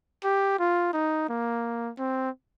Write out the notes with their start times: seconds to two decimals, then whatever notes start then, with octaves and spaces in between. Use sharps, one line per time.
0.24 G4
0.59 F4
0.93 D#4
1.29 A#3
1.98 C4